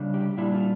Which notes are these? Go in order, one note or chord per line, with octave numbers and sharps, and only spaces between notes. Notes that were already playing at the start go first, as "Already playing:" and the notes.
Already playing: C#3 G3 D4
G4
A#2 G3 D4 E4
F4